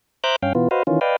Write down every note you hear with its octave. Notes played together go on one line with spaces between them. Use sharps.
C5 E5 A#5 D6 F#6 G6
G2 C#4 F5 G5
B2 E3 B3 F4
F#4 B4 C5 D#5 F5
D#3 E3 C#4 F4
B4 D5 D#5 F5 G5